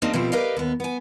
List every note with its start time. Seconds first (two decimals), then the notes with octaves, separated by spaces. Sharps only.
0.02 G3 G#3 A#3 C4 D4 D#4
0.13 B2 F3 C4 E4 G4 A4
0.32 G4 A#4 B4 D5 D#5 F5
0.57 D#2 B3
0.80 B3 G#5